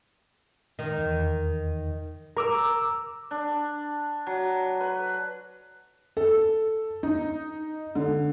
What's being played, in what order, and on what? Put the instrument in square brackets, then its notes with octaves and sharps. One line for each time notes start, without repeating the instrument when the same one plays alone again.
[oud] D#3
[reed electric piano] E2
[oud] A#4 [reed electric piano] A#5 D6 E6
[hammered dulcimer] D4
F#3
B4
[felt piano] A4
D#4
D3